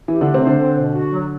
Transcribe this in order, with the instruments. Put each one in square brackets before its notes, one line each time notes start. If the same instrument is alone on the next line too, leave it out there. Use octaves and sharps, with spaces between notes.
[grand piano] E3 E4 [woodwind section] G4
[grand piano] D3 D4 [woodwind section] A3
[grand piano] C3 C4
[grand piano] D3 D4 [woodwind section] C5
[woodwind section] C4
B2
F#4
F#3